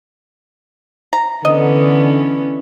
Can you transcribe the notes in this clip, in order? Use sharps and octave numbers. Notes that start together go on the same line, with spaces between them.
A#5
D3 E3 B3 C#4 D#5